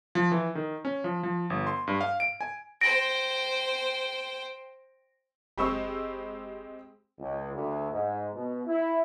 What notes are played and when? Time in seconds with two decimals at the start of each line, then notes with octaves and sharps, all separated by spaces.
0.15 F3
0.32 E3
0.55 D#3
0.85 C#4
1.04 F3
1.23 F3
1.50 G1
1.67 C6
1.87 G2
2.01 F5
2.20 D7
2.41 G#5
2.81 C5 G5 A#6 D7
5.58 F#1 G#3 C4 G4 B5 C#6 E6
7.18 C#2
7.54 D2
7.91 G#2
8.33 B2
8.66 E4